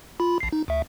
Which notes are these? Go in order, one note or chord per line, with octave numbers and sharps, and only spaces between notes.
F4 B5
A#1 C7
D#4
D2 E5